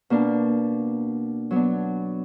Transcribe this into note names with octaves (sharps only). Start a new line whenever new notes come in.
B2 A#3 D4
F#3 B3 D4